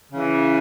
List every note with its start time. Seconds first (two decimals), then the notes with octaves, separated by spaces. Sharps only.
0.12 C#3 E3